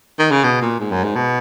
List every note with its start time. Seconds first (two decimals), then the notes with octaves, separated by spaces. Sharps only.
0.19 D#3
0.31 C#3
0.44 B2
0.62 A#2
0.80 G#2
0.92 F#2
1.04 G#2
1.16 B2